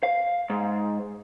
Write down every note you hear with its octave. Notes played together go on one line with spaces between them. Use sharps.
F5
G#2